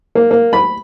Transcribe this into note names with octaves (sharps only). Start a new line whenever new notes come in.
A#3
A#3
B5